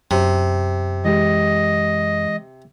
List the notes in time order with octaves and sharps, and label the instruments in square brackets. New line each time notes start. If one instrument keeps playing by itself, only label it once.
[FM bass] F#2 [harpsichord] C3
[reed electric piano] E3 G#3 G4 [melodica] D#5